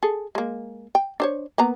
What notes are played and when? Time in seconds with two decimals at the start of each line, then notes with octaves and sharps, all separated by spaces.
0.03 G#4 A4
0.35 G#3 A#3
0.95 G5
1.20 D4 C5 C#5
1.58 A#3 B3 A#5